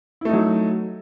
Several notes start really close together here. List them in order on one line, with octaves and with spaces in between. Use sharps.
E4 A3 D#4 F#3